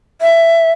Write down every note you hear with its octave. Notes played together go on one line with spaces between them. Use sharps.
E5